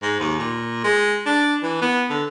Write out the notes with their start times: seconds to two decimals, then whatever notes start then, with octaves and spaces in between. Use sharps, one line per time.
0.02 G#2
0.20 D#2
0.39 A#2
0.84 G#3
1.26 D4
1.62 E3
1.81 B3
2.09 D3